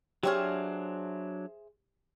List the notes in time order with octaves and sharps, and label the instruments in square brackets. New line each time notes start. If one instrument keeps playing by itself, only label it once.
[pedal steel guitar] F#3 D4 F6 [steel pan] G4 C#5 [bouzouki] G#4 C5 E5